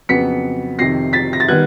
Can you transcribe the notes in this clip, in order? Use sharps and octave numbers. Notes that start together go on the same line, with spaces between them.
F2 C#3 F#3 B3 B6 C#7
F2 C3 D#3 A#6 C7
A6 B6
A#6
A6
D#3 G3 B3 F#6 G#6